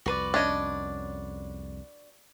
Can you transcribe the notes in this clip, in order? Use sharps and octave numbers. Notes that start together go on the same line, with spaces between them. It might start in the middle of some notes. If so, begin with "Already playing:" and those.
C2 F2 F#4 B4 D5
C#4 D4 C#5 D#5